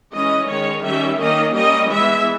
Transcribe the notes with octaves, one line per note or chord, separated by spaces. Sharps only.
E3 G#3 C#4 D#5
D#3 G#3 C#4 C#5
D#3 G3 C#4 E5
D#3 A#3 C#4 D#5
G3 A#3 C#4 D#5
E3 G#3 B3 E5